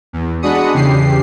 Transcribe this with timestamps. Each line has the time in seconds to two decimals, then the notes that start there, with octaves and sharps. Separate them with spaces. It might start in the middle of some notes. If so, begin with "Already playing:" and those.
0.13 E2
0.42 G#3 D4 F#4 B5 D#6 C#7
0.74 E2 C#3 G4 C7